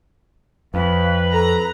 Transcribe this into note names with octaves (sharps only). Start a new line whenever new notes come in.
F2 B4 F5
A4 A#5